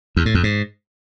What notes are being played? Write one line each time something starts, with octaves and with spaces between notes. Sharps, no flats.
E2
A2
F2
G#2